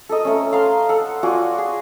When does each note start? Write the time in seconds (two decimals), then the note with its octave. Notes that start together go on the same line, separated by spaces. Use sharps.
0.09 A4 A#4 D#5
0.25 A3 C#4
0.52 A4 F5 A#5 C6
0.89 A4 F#5
1.23 F4 F#4 D5 G#5
1.58 G#4